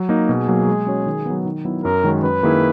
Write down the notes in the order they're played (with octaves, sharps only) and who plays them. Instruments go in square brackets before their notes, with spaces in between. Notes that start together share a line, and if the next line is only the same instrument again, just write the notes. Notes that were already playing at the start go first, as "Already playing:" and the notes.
Already playing: [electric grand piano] F#3
A#3 D#4
[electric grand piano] B2 [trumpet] G#4
[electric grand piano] F#3 A#3
G#3
C#4 F#4 C#5
D#3
F#3 B3
D#3
F#3 B3 E4
[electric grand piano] F#2 [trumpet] A#4
[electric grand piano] D#3 G#3 C#4 F#4
[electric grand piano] F#2 [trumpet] B4
[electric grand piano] D#3 A#3 E4 G#4